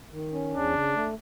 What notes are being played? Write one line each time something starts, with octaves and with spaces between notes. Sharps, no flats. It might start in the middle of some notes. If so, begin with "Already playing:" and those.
D#3
C#4
E2 D4
C#3
A3